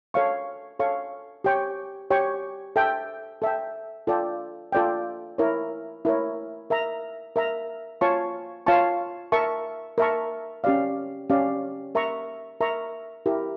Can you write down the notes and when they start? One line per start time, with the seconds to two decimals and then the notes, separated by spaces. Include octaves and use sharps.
0.14 A4 C#5 F5 C#6
0.80 A4 C#5 F5 C#6
1.44 G4 C#5 G5 C#6
2.11 G4 C#5 G5 C#6
2.76 A4 E5 G5
3.42 A4 E5 G5
4.07 F4 A4 D5 G5
4.72 F4 A4 D5 G5
5.38 E4 A#4 C#5
6.05 E4 A#4 C#5
6.70 A#4 E5 A#5
7.36 A#4 E5 A#5
8.01 F4 C#5 F5 A5 C#6
8.66 F4 C#5 F5 A5 C#6
9.32 A#4 E5 A5 C#6
9.98 A#4 E5 A5 C#6
10.64 C#4 G4 D5 F5
11.30 C#4 G4 D5 F5
11.95 A#4 E5 A#5 C#6
12.61 A#4 E5 A#5 C#6
13.26 E4 G4 A#4